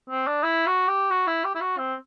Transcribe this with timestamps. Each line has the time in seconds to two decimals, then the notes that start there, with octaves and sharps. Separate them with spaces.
0.10 C4
0.27 D4
0.43 E4
0.67 F#4
0.88 G4
1.10 F#4
1.27 E4
1.44 G4
1.55 E4
1.61 F#4
1.78 C4